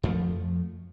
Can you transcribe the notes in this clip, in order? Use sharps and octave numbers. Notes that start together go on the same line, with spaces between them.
F2 F3 A3